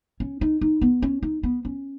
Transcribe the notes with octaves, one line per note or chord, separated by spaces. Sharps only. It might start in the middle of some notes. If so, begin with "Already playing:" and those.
C#4
D#4
D#4
B3
C#4
D#4
B3
C#4